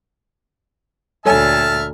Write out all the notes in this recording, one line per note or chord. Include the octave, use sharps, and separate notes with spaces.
D2 A#2 A4 C#5 E5 G#5 A5 F6